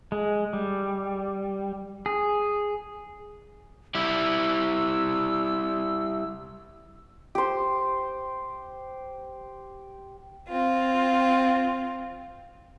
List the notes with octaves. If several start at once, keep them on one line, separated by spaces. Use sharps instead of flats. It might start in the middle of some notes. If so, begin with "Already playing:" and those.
G#3
G3
G#4
G3 E4 E6
G4 C5
C4 F4